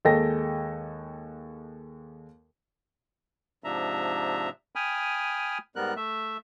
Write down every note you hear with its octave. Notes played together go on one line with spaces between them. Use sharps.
D#2 G#3 A4 D#5 G5 A#6
G#2 C3 F3 D4 E5 A#5
G5 G#5 B5 D#6 F6
G#2 G3 B3 A#4 F#6
A3 E5